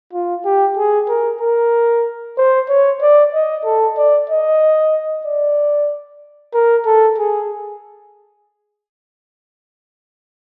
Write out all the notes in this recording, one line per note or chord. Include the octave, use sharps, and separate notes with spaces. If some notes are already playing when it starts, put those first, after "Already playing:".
F4
G4
G#4
A#4
A#4
C5
C#5
D5
D#5
A4
D5
D#5
D5
A#4
A4
G#4